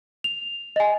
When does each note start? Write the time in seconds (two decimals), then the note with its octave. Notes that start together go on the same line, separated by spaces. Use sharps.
0.24 F7
0.76 D#5 G#5